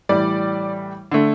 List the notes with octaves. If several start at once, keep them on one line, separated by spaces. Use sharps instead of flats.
A2 E3 G3 D5
D3 A3